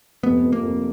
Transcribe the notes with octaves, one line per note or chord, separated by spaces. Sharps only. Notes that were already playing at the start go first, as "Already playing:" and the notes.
F1 B3
F2
A#3
F2